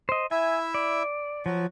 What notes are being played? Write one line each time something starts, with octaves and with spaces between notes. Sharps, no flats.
C5 D#5
E4 E5 G#5
D5
F3 F#3 F#4